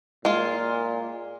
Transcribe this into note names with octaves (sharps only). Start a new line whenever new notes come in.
A#2 G#3 F4